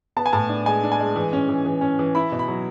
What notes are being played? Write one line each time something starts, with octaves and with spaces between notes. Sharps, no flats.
B3 A5
G#5
A2 A5
D4
G#3 G#5
D4
G#5
G#3
E3
C#4
E3
E3
C#4
E3
E4 B5
B2
B5
F#3